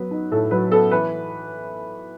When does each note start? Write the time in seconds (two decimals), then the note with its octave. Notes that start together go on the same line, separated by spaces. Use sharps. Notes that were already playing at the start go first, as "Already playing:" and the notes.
Already playing: F#3 B3 B4
0.11 D#4
0.32 A2 A4
0.51 F#3 B4
0.72 B3 A4
0.91 E3 B4